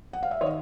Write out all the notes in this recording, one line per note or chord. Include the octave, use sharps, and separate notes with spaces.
F#5
F5
E5
D#3 C#5 D#5